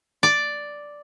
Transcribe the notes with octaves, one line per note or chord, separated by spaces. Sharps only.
D5